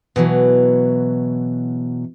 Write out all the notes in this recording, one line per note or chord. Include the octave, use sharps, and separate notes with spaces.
B2 E3 F#3